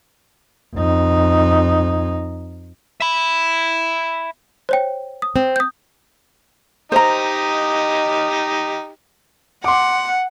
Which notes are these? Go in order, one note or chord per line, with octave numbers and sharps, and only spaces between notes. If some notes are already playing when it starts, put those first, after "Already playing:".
F2 D#4
E5 B5
C5 C#5 G5
D#6
C4
D#6 G6
D#4 G4 C5 D#5 A#5
F#5 C6 D6